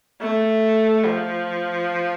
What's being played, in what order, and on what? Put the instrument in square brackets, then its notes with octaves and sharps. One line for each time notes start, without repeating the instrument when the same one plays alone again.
[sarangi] A3
F3